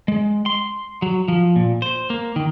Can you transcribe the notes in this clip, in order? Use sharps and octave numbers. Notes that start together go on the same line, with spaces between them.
G#3
C6
F#3
F3
A#2
C5
A#3
D#3